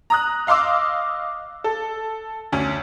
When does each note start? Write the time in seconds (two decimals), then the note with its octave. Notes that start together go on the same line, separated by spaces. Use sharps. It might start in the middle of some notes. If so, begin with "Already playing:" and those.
0.10 A#5 D#6 F#6
0.47 D#5 F5 C6 D6 E6
1.64 A4
2.52 D2 C#4